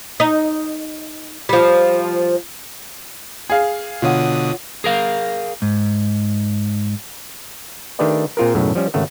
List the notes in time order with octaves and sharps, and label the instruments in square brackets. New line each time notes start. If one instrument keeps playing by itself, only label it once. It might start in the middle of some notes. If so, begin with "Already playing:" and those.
[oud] D#4
F3 G3
[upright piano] G#4 F5
[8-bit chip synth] B2 D3 D#6 [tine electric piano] F4 C#5 F#5
[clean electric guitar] G#4 A#4 F5
G#2
[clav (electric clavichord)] D#3 A3 D4 G4 B4 D5
A#2 C4 F4 G#4 A#4
B1 F#2 A2 C#3
F3 G3 C#4
G#1 C#3 A3 F#5